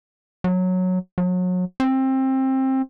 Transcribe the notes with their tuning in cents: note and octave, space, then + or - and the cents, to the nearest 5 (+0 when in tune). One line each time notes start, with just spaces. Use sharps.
F#3 -10
F#3 -30
C4 +20